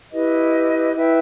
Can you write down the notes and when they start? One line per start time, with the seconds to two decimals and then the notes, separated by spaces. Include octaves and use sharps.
0.11 E4 G4 B4 D#5
0.94 E4 B4 E5 G5